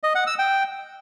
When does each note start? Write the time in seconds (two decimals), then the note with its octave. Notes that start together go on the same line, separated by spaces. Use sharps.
0.03 D#5
0.15 F#5
0.27 E6
0.39 G5